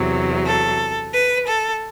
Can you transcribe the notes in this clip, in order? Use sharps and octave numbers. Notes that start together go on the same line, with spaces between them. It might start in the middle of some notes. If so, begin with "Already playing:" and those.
Already playing: E2 C3 F#3
A4
B4
A4